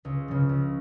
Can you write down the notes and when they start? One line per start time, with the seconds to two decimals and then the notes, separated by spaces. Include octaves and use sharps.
0.05 C#2
0.28 C#3 F3
0.49 C#2